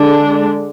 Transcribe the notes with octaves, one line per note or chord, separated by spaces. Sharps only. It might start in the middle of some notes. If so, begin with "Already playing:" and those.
Already playing: D3 G#3 D4